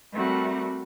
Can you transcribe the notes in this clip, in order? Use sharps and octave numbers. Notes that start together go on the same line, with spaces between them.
G3 A3 C4 F#4 A#4 F#5